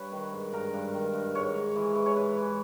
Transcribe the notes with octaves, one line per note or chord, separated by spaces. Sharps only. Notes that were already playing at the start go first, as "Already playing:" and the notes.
Already playing: G2 B4 C#5
D#3
G#2
G2 A#4
G2
D#3
G2
G#2 C#5
G#2
E3
E3
C#5
G#2 B4
E3